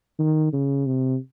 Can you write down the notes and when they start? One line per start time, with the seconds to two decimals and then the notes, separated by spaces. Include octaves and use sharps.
0.19 D#3
0.53 C#3
0.86 C3